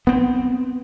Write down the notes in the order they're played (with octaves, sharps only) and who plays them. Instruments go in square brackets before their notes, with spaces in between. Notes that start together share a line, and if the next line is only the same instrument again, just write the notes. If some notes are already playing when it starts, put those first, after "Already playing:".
[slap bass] B3 C4